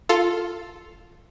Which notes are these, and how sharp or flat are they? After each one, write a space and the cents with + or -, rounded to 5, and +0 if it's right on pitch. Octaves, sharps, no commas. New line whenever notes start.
F4 +0 A4 +0